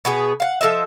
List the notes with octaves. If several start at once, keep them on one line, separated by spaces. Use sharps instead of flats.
B2 B3 G#4
F5 F#5
F3 A4 D#5 E5